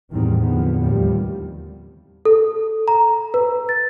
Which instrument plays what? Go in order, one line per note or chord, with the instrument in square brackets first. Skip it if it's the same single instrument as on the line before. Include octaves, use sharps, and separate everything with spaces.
[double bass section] E2 A2 D#3 G3 C4
E2 A2 D3 F3 B3
D#2 A2 C3 F3 G3
[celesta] A4
A#5
B4
A6